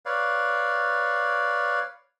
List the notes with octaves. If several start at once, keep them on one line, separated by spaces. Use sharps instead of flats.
B4 C#5 D5 F5